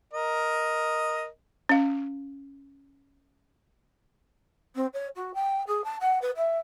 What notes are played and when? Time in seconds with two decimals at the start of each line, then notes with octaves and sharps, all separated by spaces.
0.14 A#4 D#5
1.69 C#4 F5
4.75 C4
4.94 C#5
5.16 F#4
5.34 G5
5.67 G#4
5.84 A5
6.01 F#5
6.22 B4
6.36 E5